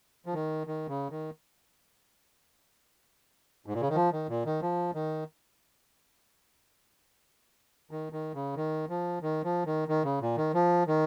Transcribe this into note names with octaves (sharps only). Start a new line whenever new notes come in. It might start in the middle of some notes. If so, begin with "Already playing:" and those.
F3
D#3
D#3
C#3
D#3
G#2
A#2
C#3
D#3
F3
D#3
A#2
D#3
F3
D#3
D#3
D#3
C#3
D#3
F3
D#3
F3
D#3
D#3
C#3
A#2
D#3
F3
D#3